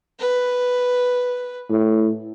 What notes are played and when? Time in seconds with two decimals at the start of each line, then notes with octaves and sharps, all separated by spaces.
0.19 B4
1.70 A2